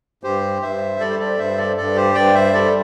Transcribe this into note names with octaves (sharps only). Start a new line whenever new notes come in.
G2 G4 C5
G2 C5 E5
G3 A4 D5
C5
A4 D5
G2 C5 E5
A4 D5
G2 A4 D5
G4 C5
G2 D5 G5
C5 E5
G3 A4 D5